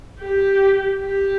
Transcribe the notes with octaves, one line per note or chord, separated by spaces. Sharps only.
G4
G4